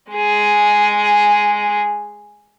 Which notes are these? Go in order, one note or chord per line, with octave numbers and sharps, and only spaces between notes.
G#3 G#4